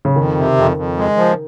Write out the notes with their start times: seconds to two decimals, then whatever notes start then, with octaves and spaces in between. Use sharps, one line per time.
0.05 C#3
0.16 F2 D#3
0.37 C3
0.57 F2
0.77 F2
0.97 G#3
1.17 F3